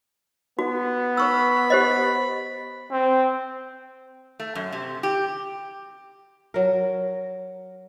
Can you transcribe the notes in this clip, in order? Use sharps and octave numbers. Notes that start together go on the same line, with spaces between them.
B3 F#4
B4 B5 C#6 E6
G4 C5 D#5
C4
A3
F#2
C3
G4
F#3 A#4